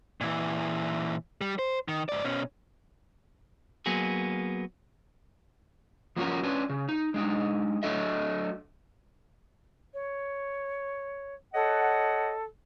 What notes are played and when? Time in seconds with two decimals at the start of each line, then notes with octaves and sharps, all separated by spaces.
0.21 A#2 E3
1.41 G3
1.59 C5
1.88 D#3
2.09 G#2 D5
2.24 B2 C#4
3.86 F#3 A#3 B3 G#4
6.16 F3 A#3 C#4 F#4 A#4
6.43 C#4 D4 B4
6.69 C#3
6.89 D#4
7.14 G#3 D4 D#4
7.83 F#3 A3 D4 A4 D#5 E5
9.94 C#5
11.54 A4 C#5 D#5 F#5